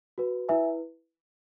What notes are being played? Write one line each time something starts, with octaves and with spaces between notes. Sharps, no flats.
F#4 B4
E4 B4 E5 G#5